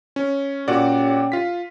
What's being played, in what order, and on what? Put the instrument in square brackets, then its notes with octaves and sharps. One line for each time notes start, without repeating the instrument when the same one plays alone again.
[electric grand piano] C#4
[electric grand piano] A#2 F#4 D5 [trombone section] C#4 G4
[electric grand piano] F4 B6